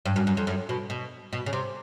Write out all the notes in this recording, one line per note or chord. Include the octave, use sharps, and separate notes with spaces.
G2
F#2
F#2
F2
F#2
B2
B2
B2
C#3
C3